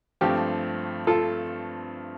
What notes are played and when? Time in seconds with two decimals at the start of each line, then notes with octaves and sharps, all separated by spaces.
0.21 G2 F3 A3 C4 G4
1.07 F4 A4